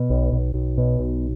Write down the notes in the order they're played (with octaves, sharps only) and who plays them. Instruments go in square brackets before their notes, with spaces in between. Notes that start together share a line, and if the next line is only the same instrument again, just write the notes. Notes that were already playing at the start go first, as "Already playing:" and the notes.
Already playing: [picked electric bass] B2
B1
B1
B1
B2
B1